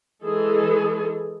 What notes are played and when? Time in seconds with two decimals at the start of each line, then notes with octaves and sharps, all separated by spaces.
0.24 E3 G#3 G#4 A4